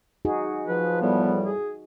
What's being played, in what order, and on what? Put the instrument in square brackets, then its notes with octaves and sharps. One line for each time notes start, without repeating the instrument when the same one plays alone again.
[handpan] D#4 F#4 G#4
[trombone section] F3 [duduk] B4
[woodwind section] E2 A2 G3 [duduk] B3
[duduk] G#4